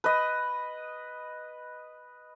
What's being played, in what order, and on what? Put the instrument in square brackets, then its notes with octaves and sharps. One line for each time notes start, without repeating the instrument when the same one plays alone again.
[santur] B4 D#5